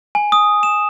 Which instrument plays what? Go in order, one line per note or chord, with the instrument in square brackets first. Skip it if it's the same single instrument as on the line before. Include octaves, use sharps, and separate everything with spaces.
[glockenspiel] G#5
D#6
E7